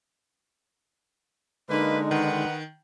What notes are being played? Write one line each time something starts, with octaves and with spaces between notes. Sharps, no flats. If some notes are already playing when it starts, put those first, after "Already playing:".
D3 G#3 A#3 D#4 B4
D#3 B4 F#5